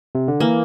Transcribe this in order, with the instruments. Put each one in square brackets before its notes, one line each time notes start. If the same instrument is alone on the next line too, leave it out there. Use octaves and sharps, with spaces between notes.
[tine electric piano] C3
D3
[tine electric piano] E3 [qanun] A#3